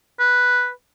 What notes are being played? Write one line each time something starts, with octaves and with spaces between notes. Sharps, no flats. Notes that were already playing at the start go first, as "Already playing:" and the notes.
B4